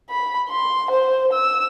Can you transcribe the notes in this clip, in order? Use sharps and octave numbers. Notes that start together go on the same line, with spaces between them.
B5
C6
C5
E6